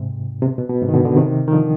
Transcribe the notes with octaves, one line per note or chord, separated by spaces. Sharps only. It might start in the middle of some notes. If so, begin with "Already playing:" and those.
Already playing: G#2 C3
C3
B2
B2
B2
G#2 C3
D#3
B2 D3
B2 D3
C3 D#3
D#3
D3 F3